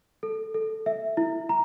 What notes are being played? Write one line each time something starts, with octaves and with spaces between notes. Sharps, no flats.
A4
A4
E5
E4
A#5